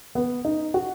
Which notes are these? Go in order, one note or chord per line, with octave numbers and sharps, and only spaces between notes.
B3
D#4
F#4